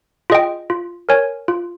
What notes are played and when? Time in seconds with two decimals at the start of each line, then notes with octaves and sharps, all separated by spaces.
0.30 F4 G#4 D#5 G5
0.70 F4
1.09 A#4 C#5 G#5
1.48 F4